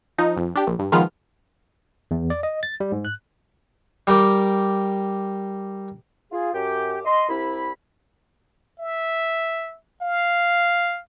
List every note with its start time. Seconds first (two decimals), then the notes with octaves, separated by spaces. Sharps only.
0.18 F3 D#4
0.37 F2
0.55 D4 G4
0.67 A#1
0.79 G2
0.92 D#3 F3 G#3 B3 F4 F6
2.11 E2
2.30 D5
2.43 D#5
2.63 A6
2.80 G3
2.92 G#2
3.05 F#6
4.07 G3 A#4 G5 D6
6.32 F4 G#4
6.53 F#2 G4
7.05 D#5 C6
7.28 C2 C3 E4 B5
8.79 E5
10.02 F5